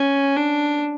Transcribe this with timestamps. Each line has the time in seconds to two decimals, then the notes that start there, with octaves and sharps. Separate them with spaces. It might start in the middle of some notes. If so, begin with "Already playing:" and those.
Already playing: C#4
0.36 D4